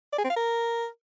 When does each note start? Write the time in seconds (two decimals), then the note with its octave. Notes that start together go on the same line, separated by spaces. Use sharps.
0.12 D5
0.18 G#4
0.24 C4
0.30 F5
0.36 A#4